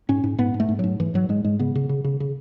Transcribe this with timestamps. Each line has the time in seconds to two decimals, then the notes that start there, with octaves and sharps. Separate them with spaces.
0.09 G#2 C#4
0.24 G#2
0.38 G#2 B3
0.54 G#2
0.60 A3
0.69 G#2
0.79 G#2 F#3
1.00 G#2 E3
1.14 G#2 F#3
1.29 G#2 G#3
1.44 G#2 G#3
1.59 C#3 B3
1.75 C#3
1.89 C#3
2.04 C#3
2.20 C#3